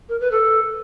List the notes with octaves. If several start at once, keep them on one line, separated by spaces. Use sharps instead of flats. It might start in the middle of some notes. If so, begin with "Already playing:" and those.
A#4
B4
A4